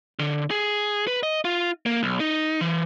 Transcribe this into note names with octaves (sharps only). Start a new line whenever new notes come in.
D3
G#4
B4
D#5
F4
A#3
B1
D#4
E3